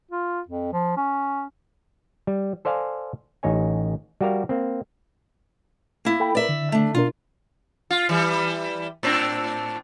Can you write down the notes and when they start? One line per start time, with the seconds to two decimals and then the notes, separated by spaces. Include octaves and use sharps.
0.11 F4
0.49 F2
0.73 F3
0.97 C#4
2.27 G3
2.65 A4 C5 D5 F5 G#5
3.43 A1 D#4 C#5 G#5
4.21 G3 F#4 G4 A#4 F5
4.49 A#3 C4
6.05 A#3 E4
6.20 A4 G5 B5
6.35 A#4 B4 D5 E5
6.49 D3
6.72 A3 D4
6.95 B2 D4 F4 A#4
7.90 F4
8.09 E3 G3
9.03 A2 C4 D4